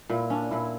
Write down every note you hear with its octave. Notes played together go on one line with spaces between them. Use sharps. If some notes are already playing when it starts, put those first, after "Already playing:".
A#2 E4
C#4 D4
A#2 E4